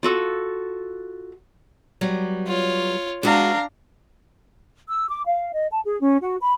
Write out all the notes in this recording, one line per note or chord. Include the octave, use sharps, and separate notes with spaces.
F4 F#4 A4
F#3 G3 B3
F4 C#5
G#3 B3 D4 F#4 F5 A#5
E6
D6
F5
D#5
A5
G#4
C#4
F#4
B5